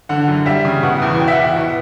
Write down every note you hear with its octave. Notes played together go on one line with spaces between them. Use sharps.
D3 F#5
F#2
G3 E5
C#3
B2 F#5
E2
B2 G5
E5
F#5
E2
F#5
B2